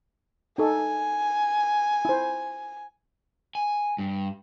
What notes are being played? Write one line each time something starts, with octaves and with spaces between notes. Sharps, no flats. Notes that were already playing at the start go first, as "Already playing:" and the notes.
D#4 A4 G#5
E4 C5
G#5
G2